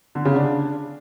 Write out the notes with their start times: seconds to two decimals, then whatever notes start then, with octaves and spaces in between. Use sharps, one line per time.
0.15 D3
0.25 C#3
0.35 D4